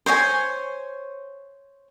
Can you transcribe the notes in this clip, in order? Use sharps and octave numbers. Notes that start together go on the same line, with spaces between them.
C5 C#5 D#5 G#5